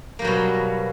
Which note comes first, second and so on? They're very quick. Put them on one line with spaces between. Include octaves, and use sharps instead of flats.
A#3 G3 F#3 B2